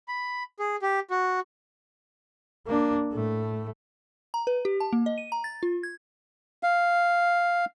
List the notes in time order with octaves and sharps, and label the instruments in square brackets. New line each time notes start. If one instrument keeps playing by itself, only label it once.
[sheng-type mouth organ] B5
G#4
G4
F#4
[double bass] A#3 D4
A2 A3
[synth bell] A#5
B4
G4
A5
A#3
D#5
D#7
A#5
A6
F4
G#6
[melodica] F5